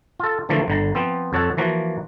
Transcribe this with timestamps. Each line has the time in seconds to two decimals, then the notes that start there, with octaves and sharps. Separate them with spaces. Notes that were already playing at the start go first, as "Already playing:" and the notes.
0.20 F4 A4
0.49 D3 E3 F3 A3 A#3
0.68 G1 D3 A#5
0.95 F3 B3 C4
1.33 F2 A4 C#5 F#5 A5
1.57 E3 F3 A#3 F#4